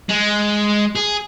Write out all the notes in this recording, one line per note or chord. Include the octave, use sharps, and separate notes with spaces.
G#3
G#4